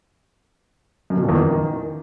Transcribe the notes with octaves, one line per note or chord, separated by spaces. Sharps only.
F#2
B2
A#2
E2
D#3